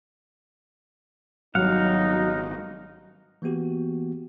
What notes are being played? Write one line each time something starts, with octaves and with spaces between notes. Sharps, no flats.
G#1 F#3 G3 D#4 F5 F#5
E3 A#3 B3 F#4 G4